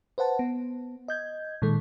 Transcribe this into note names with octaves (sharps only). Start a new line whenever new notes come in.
B4 C5 F#5 A5
B3
D#5 G6 G#6
A#2 D#3 G#3 A4